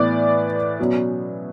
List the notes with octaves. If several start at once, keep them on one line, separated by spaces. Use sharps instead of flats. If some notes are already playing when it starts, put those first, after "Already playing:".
Already playing: A2 E3 B3 D5
B2 F#3 C#4